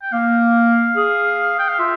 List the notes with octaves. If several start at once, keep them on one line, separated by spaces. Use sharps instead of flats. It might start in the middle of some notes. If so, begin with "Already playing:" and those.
G5
A#3 F5
G#4
G5
F5
F4 E5